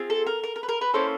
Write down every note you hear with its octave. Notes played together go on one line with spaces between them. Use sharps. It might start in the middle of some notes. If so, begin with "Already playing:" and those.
Already playing: C4 F4 G#4
A4
A#4
A#4
A#4
B4
A#4
B4
A#3 C#4 E4 A4 C5